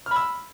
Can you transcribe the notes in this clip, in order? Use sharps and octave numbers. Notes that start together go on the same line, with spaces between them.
B5 E6 F6